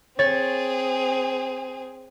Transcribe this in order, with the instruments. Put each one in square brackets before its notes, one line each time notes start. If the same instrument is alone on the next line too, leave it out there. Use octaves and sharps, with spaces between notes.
[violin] C4 G#4 [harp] C#5 A6